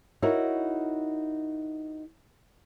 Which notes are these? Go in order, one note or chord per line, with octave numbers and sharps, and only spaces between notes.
D#4 E4 F#4 A#4 C#5